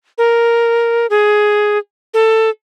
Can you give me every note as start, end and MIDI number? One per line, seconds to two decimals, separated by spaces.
0.18 1.06 70
1.10 1.78 68
2.14 2.50 69